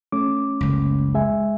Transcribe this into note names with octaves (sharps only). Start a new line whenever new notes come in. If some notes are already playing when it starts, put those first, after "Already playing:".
A3 C#4 D6
F#1 C#2
G#3 E5 G#5